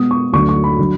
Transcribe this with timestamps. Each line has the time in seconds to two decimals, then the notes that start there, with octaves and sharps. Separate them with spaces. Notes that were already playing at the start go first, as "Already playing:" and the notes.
Already playing: B2 G#3 B3 D#6
0.11 C#6
0.33 D2 D3 F#3 C#6
0.49 C#6
0.64 B5
0.79 D3 F#3